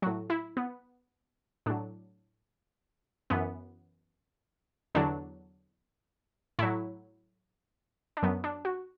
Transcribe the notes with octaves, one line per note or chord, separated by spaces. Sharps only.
A2 F#3 F#4
E4
B3
A2 F#3 D4
F#2 E3 B3
E2 D3 F#3 D4
A2 F#3 E4
D4
F#2 F#3 B3
D4
F#4